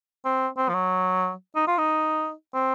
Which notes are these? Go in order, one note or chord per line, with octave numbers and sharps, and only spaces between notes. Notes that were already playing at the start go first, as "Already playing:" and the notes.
C4
C4
F3
F#3
D#4
F4
D#4
C4